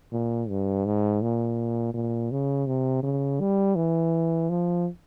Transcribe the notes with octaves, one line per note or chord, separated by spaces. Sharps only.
A#2
G2
G#2
A#2
A#2
C#3
C3
C#3
G3
E3
F3